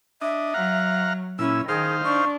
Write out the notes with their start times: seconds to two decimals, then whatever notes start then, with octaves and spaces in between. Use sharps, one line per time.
0.22 D4 D#5 E5
0.54 F#3 F5 F#5 A#5
1.39 A#2 C#4 E4 E6
1.68 D#3 D#4 G#4 C5 F5
2.04 D4 C#6